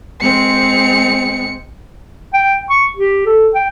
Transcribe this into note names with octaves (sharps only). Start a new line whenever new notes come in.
G#3 C4 C#7
G5
C#6
G4
A4
G5